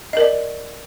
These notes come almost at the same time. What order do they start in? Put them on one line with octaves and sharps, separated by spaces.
D#5 A#4 D5